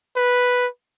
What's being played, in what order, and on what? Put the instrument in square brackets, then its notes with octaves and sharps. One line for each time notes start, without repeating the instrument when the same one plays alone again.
[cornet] B4